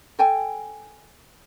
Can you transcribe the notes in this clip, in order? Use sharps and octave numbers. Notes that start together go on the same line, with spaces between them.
A4 G5 G#5